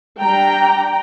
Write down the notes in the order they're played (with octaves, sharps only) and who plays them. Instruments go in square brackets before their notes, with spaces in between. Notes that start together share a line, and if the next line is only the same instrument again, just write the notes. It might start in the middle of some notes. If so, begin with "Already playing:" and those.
[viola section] G3 D4 G5 A#5